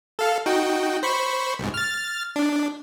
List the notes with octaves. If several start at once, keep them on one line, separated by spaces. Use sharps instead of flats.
A4 F5
D#4 F#4 G5
C5 B5 C#6
C2 G#2
F6 A6
D4